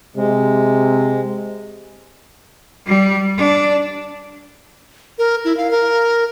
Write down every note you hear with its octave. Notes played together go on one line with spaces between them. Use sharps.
C3 G#3
G3
D4
A#4
E4
F5
A#4